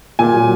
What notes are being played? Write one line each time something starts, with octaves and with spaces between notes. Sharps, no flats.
A#2 G#5
F#3